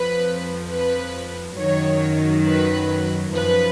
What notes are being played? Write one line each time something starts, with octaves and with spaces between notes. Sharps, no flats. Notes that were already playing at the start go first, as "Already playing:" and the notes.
Already playing: F2 F3 B4
B4
F#2 D#3 F#3 C#5
B4
F#2 F3 B4